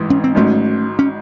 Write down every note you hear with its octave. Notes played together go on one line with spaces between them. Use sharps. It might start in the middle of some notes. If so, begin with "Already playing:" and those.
Already playing: A1 G#2 E3
C#4
C4
G#1 G#2 F#3 A3 C#4
C#4